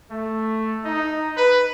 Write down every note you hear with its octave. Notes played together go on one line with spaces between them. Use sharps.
A3
D#4
B4